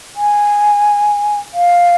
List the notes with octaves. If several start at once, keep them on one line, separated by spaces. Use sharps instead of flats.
G#5
F5